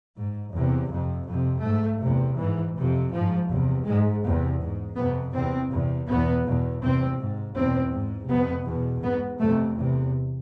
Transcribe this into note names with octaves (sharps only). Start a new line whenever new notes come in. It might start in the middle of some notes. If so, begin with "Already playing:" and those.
G#2
E2 C3
F2 C3
F2 C3
G#2 A3
E2 C3
G#2 E3
F2 C3
G#2 F3
E2 C3
G#2 G#3
E2 C3
G#2
F2 C3 B3
E2 C3 C4
E2 C3
E2 B2 B3
E2 B2
E2 C3 C4
G#2
E2 B2 C4
G#2
F2 C3 B3
E2 B2
G#2 B3
F2 C3 A3
E2 C3